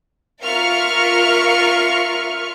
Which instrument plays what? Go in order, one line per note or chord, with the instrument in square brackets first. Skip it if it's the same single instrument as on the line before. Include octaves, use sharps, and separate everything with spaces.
[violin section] F4 A#4 E5 C#6 F6 C#7